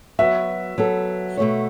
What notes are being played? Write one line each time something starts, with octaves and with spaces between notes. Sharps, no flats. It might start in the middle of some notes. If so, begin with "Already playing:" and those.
F#3 B3 F#4 E5
F#3 B3 A4
B2 A3 F#4 C#5